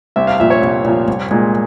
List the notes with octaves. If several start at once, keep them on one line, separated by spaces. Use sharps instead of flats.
C2 E5
F5
A#2 F3 E5
C#5
C2
A#2 F3
C2
A#2 G#3